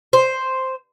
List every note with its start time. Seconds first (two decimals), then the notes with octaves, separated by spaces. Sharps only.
0.13 C5